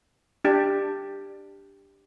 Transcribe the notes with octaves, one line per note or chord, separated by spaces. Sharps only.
D4 G4